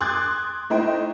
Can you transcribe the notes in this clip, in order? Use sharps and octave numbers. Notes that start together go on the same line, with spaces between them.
C6 D6 D#6 F#6 G#6 A6
A3 D#4 E4 C5 D#5 G5